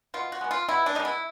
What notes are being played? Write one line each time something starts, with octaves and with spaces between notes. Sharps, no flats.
B2 F4
F#4
G#3 B3
F4
B2 E4
D4
G#3 B3 D#4
E4